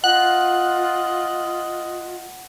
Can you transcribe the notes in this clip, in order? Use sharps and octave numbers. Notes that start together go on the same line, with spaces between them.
F4 D#5 F#5 F#6